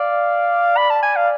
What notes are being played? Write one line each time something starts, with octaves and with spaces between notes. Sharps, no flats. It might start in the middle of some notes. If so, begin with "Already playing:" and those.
Already playing: D5 F5
B5
A5
G#5
F5